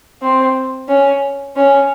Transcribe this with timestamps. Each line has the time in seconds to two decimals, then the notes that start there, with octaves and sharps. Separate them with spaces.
0.22 C4
0.88 C#4
1.56 C#4